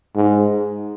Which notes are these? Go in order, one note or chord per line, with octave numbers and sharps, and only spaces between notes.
G#2